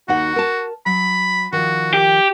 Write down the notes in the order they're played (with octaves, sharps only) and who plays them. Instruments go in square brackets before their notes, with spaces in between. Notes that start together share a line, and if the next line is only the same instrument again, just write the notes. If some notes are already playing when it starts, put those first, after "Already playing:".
[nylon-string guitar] D#2 D#4 F#5 [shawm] F#4
[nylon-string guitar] A#4 A5
[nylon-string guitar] F#3 [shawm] B5
[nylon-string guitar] D#3 F3 [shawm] F#4
[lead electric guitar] G4 [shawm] G5